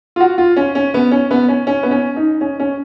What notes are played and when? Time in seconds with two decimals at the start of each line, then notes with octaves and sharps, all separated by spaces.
0.16 F4
0.20 F#4
0.38 F4
0.56 C#4
0.75 C#4
0.94 B3
1.11 C#4
1.31 B3
1.48 C#4
1.67 C#4
1.83 B3
1.91 C#4
2.16 D#4
2.41 C#4
2.60 C#4